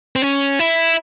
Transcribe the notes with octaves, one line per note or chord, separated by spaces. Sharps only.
C4
C#4
E4